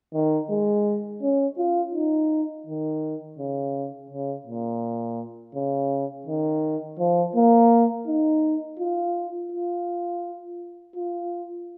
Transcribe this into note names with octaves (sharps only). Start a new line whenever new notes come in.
D#3
G#3
C#4
F4
D#4
D#3
C#3
C#3
A#2
C#3
D#3
F3
A#3
D#4
F4
F4
F4